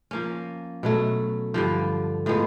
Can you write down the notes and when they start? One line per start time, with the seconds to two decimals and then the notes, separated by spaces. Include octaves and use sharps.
0.11 F3 A#3 C#4
0.83 B2 F#3 A3
1.54 G2 D3 F3
2.26 A2 F3 G#3 B3